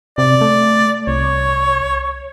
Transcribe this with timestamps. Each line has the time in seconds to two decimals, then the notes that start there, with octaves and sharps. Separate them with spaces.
0.18 C3 D5
0.41 A3
1.07 C2 C#5